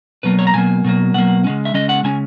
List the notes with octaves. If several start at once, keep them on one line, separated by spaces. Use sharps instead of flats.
B2 F#3 A#3 B4
C#5
A#5
B2 F#3 A#3 G#5
B2 F#3 A#3
B2 F#3 A#3 F#5
C#3 G#3 C#4
E5
C#3 G#3 C#4 D#5
F#5
C#3 G#3 C#4 G#5